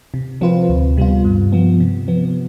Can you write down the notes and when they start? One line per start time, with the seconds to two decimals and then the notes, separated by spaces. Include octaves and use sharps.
0.14 C3
0.41 F3 C4 F4 B4
0.69 D2
0.97 C3 G3 B3 F4
1.25 G2
1.52 F3 B3
1.80 C3
2.08 F3 B3